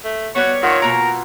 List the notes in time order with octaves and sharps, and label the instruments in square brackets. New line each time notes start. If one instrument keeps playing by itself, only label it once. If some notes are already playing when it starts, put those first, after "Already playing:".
[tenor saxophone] A3
[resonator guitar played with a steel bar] G3 B3 [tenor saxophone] F#4 [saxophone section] C#5
[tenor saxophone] D#3 [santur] F4 F#5 E6
[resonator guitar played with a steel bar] B2 A#3 A#5 [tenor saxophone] A#4